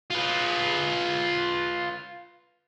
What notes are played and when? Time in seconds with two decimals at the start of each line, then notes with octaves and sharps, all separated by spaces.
0.10 F4 B4